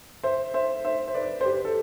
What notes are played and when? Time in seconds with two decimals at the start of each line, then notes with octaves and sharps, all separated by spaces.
0.24 C5 E5
0.54 C5 E5
0.84 C5 E5
1.08 C5
1.14 B4 D5
1.41 C5
1.45 G4 B4
1.65 A4